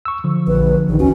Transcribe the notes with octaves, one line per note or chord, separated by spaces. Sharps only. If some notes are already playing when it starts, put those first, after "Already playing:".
C#6 E6
D3 F3
A#1 B4
A#1 D#3
D#2 C#4 F#4